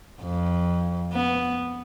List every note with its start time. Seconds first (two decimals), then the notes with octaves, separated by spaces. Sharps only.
0.22 F2
1.13 B3